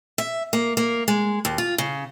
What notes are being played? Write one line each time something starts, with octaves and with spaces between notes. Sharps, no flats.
E5
A#3
A#3
G#3
D#2
F4
C#3